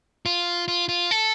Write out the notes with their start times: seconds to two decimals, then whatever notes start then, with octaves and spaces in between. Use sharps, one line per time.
0.26 F4
0.68 F4
0.89 F4
1.11 A4